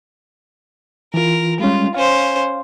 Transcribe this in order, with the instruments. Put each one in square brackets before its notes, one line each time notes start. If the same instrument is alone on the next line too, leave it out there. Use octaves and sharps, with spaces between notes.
[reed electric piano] E3 F4 [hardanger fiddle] A#4
[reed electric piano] G3 G#3 C#4 [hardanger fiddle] F4
[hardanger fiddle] C#4 C5 [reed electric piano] F5